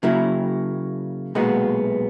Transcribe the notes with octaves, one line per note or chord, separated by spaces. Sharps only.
C#3 F#3 A#3 E4
B1 A#2 G#3 B3 F#4